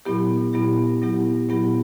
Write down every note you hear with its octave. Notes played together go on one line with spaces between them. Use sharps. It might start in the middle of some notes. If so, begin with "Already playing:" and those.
A#2 F#3 B3 E4 G4
A#2 F#3 B3 E4 G4
A#2 F#3 B3 E4 G4
A#2 F#3 B3 E4 G4